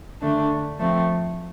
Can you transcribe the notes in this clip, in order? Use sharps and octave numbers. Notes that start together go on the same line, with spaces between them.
D3 A3 D4
F3 A3 C4